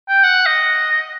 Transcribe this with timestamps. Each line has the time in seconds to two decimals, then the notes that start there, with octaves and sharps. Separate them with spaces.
0.09 G5
0.23 F#5
0.46 D#5